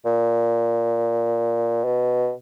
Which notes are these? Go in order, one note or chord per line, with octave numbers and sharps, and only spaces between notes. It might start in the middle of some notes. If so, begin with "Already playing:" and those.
A#2
B2